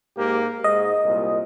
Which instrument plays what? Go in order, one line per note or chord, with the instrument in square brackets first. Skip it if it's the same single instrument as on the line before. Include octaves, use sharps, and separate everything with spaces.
[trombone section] G#2 A#3 G4
[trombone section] G#2 [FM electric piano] D#5
[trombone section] C2 A#2